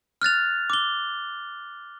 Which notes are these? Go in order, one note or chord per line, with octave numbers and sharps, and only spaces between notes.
F6 F#6 A6 F7
D6 G7